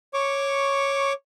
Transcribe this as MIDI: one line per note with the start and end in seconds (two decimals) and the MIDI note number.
0.14 1.13 73
0.14 1.13 85
0.14 1.13 86